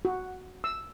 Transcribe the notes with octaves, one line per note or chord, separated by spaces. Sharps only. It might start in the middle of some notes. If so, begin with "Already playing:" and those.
F#4
E6